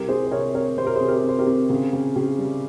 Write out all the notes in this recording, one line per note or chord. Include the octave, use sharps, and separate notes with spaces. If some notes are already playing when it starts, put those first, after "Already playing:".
Already playing: C2 G4 A#4
C4 G#4 C5
C5
C3 A#4 C#5
C4 A#4 C#5
C3 C5
A#4
G#4 C5
C3
G4 A#4
C3
C5
G4 A#4
C4
C#3
C#3
C#3
G3